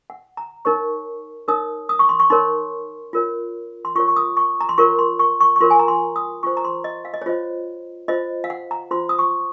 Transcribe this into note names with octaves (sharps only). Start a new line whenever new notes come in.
F#5
A#5
D#4 A#4 C#5 C#6
D#4 A#4 C#5 D#6
D#6
C#6
C6
C#6
D#4 A#4 C#5 C6
F4 A#4 C#5
C6
F4 A#4 C#5 C#6
C#6
D#6
C#6
A#5
C6
F4 A#4 C#5 C#6
C6
C#6
C#6
C#6
F4 A#4 C#5 C6
G#5
A#5
C6
D#6
F4 C5 C#6
A#5
C6
D#5
F5
D#5
C#5
F4 C5 D#5
F4 C5 D#5
F5
F#5
A#5
F4 C5 C6
D#6
C#6